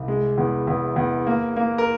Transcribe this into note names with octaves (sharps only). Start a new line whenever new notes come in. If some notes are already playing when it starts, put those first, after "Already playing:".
Already playing: C2
G#3
E2
E2
E2
A#3
A#3
A#4